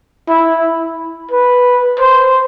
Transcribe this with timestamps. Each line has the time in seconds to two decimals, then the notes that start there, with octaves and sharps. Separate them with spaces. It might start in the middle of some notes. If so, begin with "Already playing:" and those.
0.28 E4
1.31 B4
2.00 C5